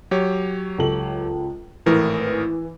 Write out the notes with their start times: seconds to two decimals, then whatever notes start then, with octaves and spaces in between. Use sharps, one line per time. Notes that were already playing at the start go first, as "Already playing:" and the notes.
0.11 F#3 G4 C#5
0.78 C#2 A4 F#7
1.86 G#1 A2 E3 A#4